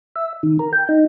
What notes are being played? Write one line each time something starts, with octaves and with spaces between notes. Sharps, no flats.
E5
D#3
A#4
G5
D#4